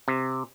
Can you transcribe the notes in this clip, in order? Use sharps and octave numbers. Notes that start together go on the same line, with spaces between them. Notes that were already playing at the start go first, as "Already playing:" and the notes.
C3